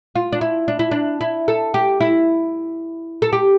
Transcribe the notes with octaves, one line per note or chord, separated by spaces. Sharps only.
F4
D4
E4
D4
E4
D4
E4
A4
G4
E4
A4
G4